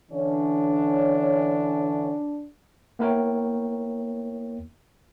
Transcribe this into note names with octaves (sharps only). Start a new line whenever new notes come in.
D3 E3 C#4 D4
A#3 B3 E4 A#4 C#5 G5